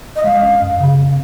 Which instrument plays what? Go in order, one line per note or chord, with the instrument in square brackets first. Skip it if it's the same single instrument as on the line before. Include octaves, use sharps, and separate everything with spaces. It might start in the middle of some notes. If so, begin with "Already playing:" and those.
[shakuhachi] D#5
[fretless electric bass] G#3 [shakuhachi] F5
[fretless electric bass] C#4
F#2
C#3
C4